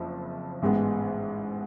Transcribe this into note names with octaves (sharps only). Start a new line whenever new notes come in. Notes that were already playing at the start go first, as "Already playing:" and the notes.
Already playing: F#1 F2 F3
A1 G#2 G#3 B3